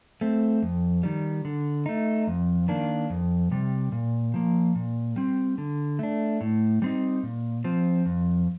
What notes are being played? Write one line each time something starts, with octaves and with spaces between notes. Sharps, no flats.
A3 C4
F2
D#3 G3
D3
A3 D#4
F2
D#3 A#3 D4
F2
C3 G3
A#2
F3 A#3
A#2
G3 C4
D3
A3 D4
A2
G3 C4 D#4
A#2
F3 C4
F2